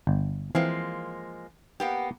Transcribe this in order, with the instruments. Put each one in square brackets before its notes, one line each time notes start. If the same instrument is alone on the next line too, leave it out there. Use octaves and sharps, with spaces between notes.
[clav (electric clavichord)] G1
[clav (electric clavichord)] E3 C4 G#5 [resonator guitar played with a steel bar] F3 G#3 A#3
[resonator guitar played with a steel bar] A#3 B3 G4